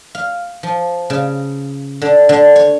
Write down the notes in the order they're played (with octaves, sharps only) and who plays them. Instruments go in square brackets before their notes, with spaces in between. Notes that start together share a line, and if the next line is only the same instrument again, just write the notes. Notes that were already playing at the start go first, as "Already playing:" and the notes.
[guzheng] F5
F3
C#3
D3
D3
C#5